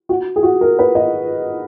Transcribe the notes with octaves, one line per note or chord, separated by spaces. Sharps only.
F#4
G#4
F#4
A#4
B4
D#5